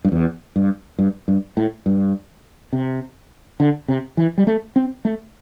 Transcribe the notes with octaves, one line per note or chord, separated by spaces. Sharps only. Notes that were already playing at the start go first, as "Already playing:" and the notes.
G2
E2
G2
G2
G2
A2
G2
C3
D3
C3
E3
G3
A3
C4
A3